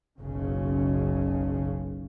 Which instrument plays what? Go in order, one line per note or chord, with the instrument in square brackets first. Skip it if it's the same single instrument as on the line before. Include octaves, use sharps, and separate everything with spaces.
[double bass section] F#1 B1 C#3